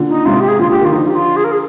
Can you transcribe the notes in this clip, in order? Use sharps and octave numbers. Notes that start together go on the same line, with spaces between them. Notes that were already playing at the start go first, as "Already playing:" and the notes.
Already playing: A#2 D3
D#4
G#2 C3 F4
G4
G#4
A#2 D3 F4
G4
D#3 F4
D3 F3 D#4
G4
F4
G#4
A#4
G#4